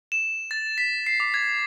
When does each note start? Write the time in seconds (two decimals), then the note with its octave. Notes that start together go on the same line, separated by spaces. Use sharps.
0.12 E7
0.51 A6
0.78 B6
1.06 C7
1.20 D6
1.34 G#6